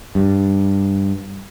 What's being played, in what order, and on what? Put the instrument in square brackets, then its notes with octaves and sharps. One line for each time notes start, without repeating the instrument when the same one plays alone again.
[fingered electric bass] G2